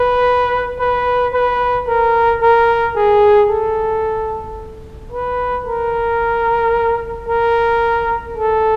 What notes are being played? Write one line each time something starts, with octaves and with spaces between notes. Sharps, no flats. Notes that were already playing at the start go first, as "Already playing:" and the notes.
Already playing: B4
B4
B4
A#4
A#4
G#4
A4
B4
A#4
A#4
A4